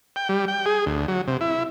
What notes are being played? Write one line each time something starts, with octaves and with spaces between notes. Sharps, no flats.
G5
G3
G5
G#4
D2
F#3
C3
E4